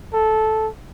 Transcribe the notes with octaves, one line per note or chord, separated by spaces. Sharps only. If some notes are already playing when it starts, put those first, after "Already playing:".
A4